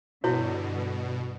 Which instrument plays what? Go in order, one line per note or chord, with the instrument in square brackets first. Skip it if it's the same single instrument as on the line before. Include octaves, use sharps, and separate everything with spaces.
[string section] G2 D3 [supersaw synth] B2 [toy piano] E4 F#4 C#5